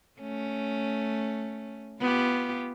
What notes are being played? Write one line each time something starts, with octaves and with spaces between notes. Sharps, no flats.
A3 C#4
B3 F4 G4